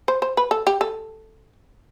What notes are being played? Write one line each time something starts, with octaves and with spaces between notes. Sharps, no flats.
C5
C5
B4
A4
G4
A4